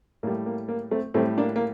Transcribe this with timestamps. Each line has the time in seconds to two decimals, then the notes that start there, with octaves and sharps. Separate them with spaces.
0.23 A2 A#3
0.27 G3
0.46 A#3
0.68 A#3
0.91 A3 C4
1.14 A2 G3 A3 C4
1.38 A#3 D4
1.56 A#3